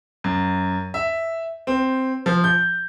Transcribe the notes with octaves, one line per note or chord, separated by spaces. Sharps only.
F#2
E5
C4
F3
G6